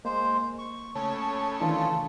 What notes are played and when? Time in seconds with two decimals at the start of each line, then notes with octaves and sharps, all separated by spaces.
0.05 G#3 A#3 C5
0.59 C#6
0.95 C#3 A3 C#5
1.61 D#3 E3 D4 F4 A4